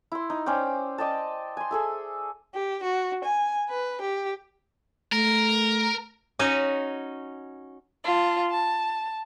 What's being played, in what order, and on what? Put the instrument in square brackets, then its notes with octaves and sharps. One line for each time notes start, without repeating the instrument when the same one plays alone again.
[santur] E4 C6
D#4
C#4 C5 D5 G5
D5 D#5 G5 A5
G#5 C6
G#4 A4 E5
[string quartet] G4
F#4
G#5
B4
G4
[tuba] A3 [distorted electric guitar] A#4
[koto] C#4 D#4 F#4
[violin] F4 A5
A5